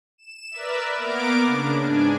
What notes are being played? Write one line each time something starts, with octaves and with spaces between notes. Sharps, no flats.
E7
A#4 B4 D5 E5
A#3 B3 A#4 D6 D7
C#3 D4
G#2 D4 G#5